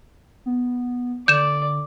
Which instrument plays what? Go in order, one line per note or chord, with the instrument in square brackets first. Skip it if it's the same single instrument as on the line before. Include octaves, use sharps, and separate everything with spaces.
[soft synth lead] B3
[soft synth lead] D3 [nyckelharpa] D5 [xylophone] G6 E7